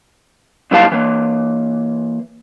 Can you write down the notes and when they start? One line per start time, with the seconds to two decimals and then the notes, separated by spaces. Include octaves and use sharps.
0.71 A#2 F#3 G3 E4 F5 A5
0.92 E3 A#3